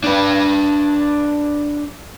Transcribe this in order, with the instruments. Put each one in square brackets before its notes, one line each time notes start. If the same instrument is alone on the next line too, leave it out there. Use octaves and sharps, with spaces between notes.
[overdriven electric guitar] D4 B4